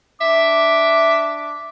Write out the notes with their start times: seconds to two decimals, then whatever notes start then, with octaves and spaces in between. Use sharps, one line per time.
0.21 D4 E5 D6